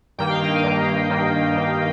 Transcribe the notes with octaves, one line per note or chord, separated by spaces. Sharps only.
G2 D#3 A#3 G5
F5
D#5
F5
G2 D#3 A#3
G2 D#3 A#3
G2 D#3 A#3